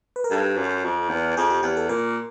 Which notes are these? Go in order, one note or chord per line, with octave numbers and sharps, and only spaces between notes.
B4
A#4
G2 A4
F#2
F2
E2
F2 G#4
G4
E2 G4
A4
A#2 A#4